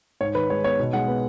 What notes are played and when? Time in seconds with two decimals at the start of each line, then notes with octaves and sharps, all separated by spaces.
0.21 G#2 C#5
0.35 D#3 B4
0.50 G#3 C#5
0.64 B3 C#5
0.79 B2
0.93 G#3 F#5
1.08 B3